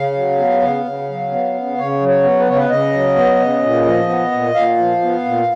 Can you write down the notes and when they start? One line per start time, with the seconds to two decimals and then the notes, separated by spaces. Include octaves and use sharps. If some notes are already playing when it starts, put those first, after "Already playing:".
Already playing: C#3 F5
0.16 F#3
0.38 B3
0.62 C#3
0.85 C#3
1.09 F#3
1.31 B3
1.54 C#3
1.78 C#3 C#5
2.01 F#3
2.08 C#5
2.23 B3
2.39 B4
2.47 C#3 C#5
2.56 B4
2.69 C#3 D#5
2.93 F#3
3.16 B3
3.40 C#3
3.62 A#2
3.86 F3
4.09 B3
4.32 A#2
4.55 A#2 F5
4.78 F3
5.02 B3
5.25 A#2